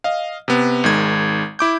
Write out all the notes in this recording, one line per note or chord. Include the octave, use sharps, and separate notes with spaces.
D#5 F5
C3 B3
G#1 D#3 G#3 G#6
E4 D6 G6